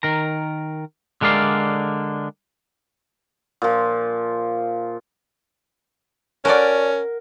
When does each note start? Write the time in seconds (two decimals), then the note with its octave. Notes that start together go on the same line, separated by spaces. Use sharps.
0.03 D#3 A#4 A#5
1.21 D3 G#3 A#4 D5 F5
3.62 A#2 F3
6.45 C#4 F#4 A4 A#4 D5 F#5